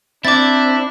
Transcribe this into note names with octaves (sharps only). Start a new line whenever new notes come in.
C4 D4 E4 D6 A6